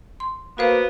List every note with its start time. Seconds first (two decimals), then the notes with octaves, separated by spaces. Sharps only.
0.20 C6
0.58 A#3 B3 F#4 B4 C5